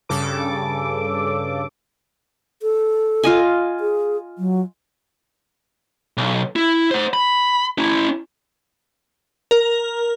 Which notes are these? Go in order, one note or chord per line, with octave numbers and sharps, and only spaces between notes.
G2 C#3 A4 D6
A4
F4 D#5 G#5
G#4
F#3
B1
E4
C5 F#5
B5
C#4 E4
A#4